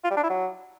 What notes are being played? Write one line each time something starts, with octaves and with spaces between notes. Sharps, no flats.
F4
G3
D4
E4
F#3